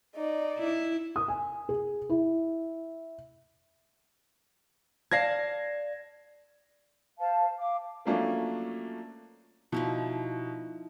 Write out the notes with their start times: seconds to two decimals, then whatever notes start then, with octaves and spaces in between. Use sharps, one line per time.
0.16 D#4 D5
0.58 E4
1.16 D#6
1.28 G#5
1.69 G#4
2.09 E4
5.11 D5 F5 A5 G#6 A#6 C7
7.18 C5 F5 A5
7.58 F5 D6
8.05 F3 F#3 A3 A#3 C#4 D4
9.72 B2 F3 D#4 E4